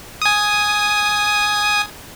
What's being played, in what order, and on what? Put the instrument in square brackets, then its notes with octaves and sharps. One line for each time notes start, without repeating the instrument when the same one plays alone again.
[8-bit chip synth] G#5 D#6